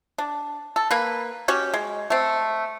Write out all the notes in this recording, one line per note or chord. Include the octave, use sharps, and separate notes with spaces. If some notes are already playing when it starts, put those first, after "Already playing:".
D4
A4
A#3 B4
C#4 F#4 G4
G#3
A3 C4